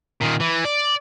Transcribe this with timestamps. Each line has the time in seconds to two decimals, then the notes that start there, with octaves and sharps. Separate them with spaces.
0.21 A#2 D#3
0.40 E3
0.65 D5